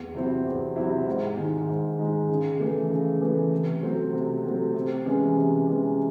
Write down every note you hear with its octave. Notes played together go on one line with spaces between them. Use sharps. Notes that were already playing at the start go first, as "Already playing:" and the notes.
Already playing: E2
C3 F#3 C4 E4
E2
C3 F#3 C4 E4
G#2
D#3 G#3
G#2
D#3 G#3
C#3
E3 A3
C#3
E3 A3
C3
F#3 A3 C4
C3
F#3 A3 C4
C3
E3 G#3 C#4
C3
E3 G#3 C#4